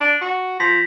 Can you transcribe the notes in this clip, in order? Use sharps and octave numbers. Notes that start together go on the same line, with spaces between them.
D4
F#4
F3 A#6 B6